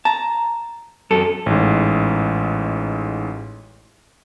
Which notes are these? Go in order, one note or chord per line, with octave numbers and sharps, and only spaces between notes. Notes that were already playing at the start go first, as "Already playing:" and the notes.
A5 A#5
F#2 A4
A1 G#2